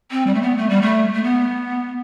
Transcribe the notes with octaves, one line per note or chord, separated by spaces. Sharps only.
C4
G3
A3
B3
A3
G3
A3
A3
B3